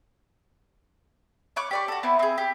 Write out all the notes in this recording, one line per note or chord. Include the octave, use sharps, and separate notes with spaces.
C#5 C#6 D6 F#6
G4 D5 C#6
F#4 A4
B3 C4 E4
C4 G#4
G4